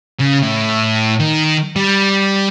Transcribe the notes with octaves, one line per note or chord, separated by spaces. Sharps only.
C#3
A2
D#3
G3